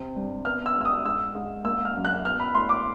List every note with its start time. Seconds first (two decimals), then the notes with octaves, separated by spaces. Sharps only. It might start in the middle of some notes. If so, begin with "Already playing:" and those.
Already playing: C3 C4
0.16 G2
0.45 B3 F6
0.66 E6
0.76 G#2 E6
0.85 D#6
1.05 G#2 E6
1.35 G#2
1.65 A#3 E6
1.85 F6
1.95 F#2
2.05 F#6
2.25 B3 F6
2.40 B5
2.54 A2 C6
2.69 D6